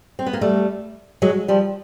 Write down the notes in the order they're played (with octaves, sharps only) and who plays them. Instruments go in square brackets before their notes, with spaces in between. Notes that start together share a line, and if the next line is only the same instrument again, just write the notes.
[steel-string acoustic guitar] C4
B3
A#3
G3 A3
F#3 G#3
F3 G3